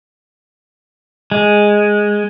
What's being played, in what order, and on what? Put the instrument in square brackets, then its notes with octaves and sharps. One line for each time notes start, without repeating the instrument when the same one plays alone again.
[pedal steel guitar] G#3